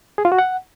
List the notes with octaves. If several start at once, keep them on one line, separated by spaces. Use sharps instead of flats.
G#4
F4
F#4
F#5